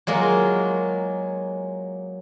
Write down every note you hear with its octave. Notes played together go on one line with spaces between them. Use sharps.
F#3 G#3 A#3 F4